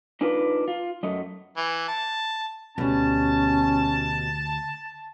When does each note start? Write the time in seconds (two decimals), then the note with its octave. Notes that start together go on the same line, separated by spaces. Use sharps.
0.21 D4 D#4 F4 B4
0.68 F4
1.03 F#2 A3 D#5
1.57 E3
1.88 A5
2.78 D2 B2 G3 C#4 A5